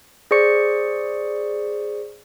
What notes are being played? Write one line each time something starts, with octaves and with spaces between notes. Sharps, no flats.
G#4 C5 D5 C#6 C#7